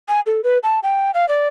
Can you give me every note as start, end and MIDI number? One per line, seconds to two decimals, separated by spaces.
0.08 0.21 80
0.26 0.41 69
0.44 0.58 71
0.63 0.79 81
0.83 1.11 79
1.14 1.28 77
1.28 1.48 74